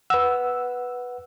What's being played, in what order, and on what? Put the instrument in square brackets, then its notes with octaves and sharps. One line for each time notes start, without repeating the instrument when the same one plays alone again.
[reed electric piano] B4 F#5 [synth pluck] E6